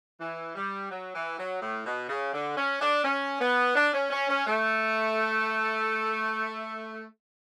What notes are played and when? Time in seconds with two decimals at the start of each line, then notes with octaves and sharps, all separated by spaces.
0.19 E3
0.55 G3
0.91 F#3
1.14 E3
1.38 F#3
1.61 A2
1.86 B2
2.09 C#3
2.33 D3
2.56 C#4
2.81 D4
3.04 C#4
3.40 B3
3.75 D4
3.94 C#4
4.11 C#4
4.29 C#4
4.47 A3